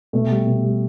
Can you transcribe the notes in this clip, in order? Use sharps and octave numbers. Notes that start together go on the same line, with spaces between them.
B2 A3
G3
B2
G3